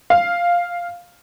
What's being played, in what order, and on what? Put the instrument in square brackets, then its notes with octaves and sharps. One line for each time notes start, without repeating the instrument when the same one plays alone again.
[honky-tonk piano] F5